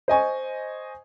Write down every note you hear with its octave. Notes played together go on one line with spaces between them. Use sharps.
C5 D#5 G#5 C#6